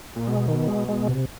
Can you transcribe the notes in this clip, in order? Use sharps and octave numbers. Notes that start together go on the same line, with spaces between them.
A#2
B2 G#3
D#3
G#3
G#3
C3